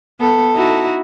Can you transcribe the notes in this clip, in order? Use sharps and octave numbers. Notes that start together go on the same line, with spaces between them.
B3 A4
D#4 E4 F#4